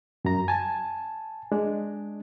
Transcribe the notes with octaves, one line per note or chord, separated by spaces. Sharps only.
F#2 A#5
G#5 A5
G#3 D4